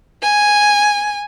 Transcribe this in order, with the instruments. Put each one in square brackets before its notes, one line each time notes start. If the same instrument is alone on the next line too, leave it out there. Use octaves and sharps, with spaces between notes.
[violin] G#5